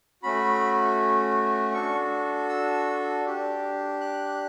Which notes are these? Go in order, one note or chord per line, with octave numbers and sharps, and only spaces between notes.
A3 C#4 F#4 B5
D4 F#4 A4 C#6
E6
D4 G4
F#6